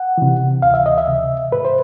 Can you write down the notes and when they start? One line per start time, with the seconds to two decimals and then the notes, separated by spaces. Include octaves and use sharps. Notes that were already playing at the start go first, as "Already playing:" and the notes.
Already playing: F#5
0.18 C3 E3
0.62 D2 F5
0.74 E5
0.86 D#5
0.98 E5
1.07 C3 E3
1.52 G#2 B4
1.65 C5